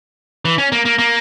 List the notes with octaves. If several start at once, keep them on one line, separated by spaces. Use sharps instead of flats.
E3
C#4
A#3
A#3
A#3